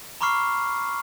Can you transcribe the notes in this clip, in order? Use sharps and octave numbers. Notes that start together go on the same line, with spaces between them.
A#5 B5 C#6 D6 F6 C7